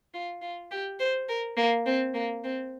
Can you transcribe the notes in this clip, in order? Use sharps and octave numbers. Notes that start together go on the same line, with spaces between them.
F4
F4
G4
C5
A#4
A#3
C4
A#3
C4